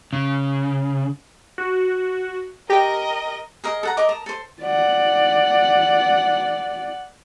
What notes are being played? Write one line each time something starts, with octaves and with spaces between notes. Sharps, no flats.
C#3
F#4
G4 A#4 D#5 G5 A#6
G#4 A#4 D#5
A4 F#5 A#5
A#4 D#5 D6
A#4 A5 A#5 D#6
A4 C5
D5 F#5